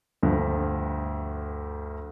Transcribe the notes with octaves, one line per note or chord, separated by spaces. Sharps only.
D2 G2 F3